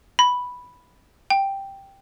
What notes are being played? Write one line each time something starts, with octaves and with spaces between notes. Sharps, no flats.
B5
G5